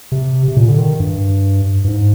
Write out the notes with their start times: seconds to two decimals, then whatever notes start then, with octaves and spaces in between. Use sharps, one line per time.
0.12 C3
0.48 C3
0.57 A#2
0.69 D3
0.78 D#3
1.00 G2
1.84 G2
1.88 G#2